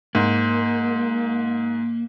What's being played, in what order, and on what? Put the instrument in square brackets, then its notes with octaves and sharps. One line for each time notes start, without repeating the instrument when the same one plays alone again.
[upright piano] G#2 [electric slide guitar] A#3